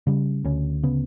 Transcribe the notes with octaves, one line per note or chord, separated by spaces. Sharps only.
C#3 G3
D2 C#4
C#3 B3